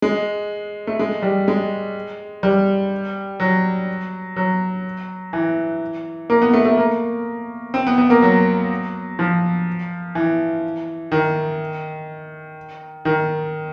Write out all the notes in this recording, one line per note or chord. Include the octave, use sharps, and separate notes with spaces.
G#3
A3
G#3
G3
G#3
G3
F#3
F#3
E3
A#3
B3
A3
A3
A#3
C4
B3
B3
A#3
F#3
F3
E3
D#3
D#3